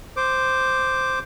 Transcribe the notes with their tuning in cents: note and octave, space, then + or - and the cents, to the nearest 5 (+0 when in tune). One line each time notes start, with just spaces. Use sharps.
C5 -5 D6 +0